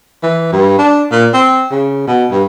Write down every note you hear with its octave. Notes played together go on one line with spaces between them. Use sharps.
E3
G2
D4
A#2
C4
C#3
B2
G2